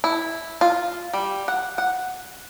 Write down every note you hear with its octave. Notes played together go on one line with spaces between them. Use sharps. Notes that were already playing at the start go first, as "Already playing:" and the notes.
E4
F4
G3
F#5
F#5